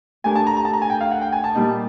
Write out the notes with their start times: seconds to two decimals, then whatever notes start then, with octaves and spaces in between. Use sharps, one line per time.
0.24 A3 D4 G4 A#4 G#5
0.36 A5
0.47 A#5
0.57 A#5
0.65 A5
0.73 A#5
0.82 G#5
0.90 G5
1.01 F5
1.11 F#5
1.21 G5
1.32 G#5
1.44 A5
1.55 A#2 G3 A#3 D#4